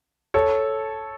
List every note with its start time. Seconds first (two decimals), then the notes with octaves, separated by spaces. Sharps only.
0.34 A4 C#5